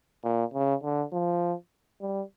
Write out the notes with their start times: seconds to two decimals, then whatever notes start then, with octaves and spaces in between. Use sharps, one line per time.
0.24 A#2
0.54 C#3
0.84 D3
1.13 F3
2.01 G3